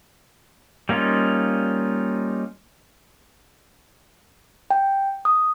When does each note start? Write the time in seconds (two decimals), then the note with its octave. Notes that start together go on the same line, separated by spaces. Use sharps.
0.89 G3 A#3 C#4 D#4 F4
4.70 G5
5.25 D#6